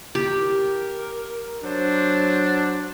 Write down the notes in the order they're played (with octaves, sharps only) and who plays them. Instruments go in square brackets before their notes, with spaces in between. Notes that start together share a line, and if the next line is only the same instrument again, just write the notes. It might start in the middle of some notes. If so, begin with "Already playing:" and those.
[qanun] G4 [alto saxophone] A#4
[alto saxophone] F#3 [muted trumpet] D4 [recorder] C5